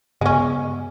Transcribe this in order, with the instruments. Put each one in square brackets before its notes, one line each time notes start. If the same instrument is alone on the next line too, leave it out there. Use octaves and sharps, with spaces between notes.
[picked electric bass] G2 C#3 B3 [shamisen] G#3 C#4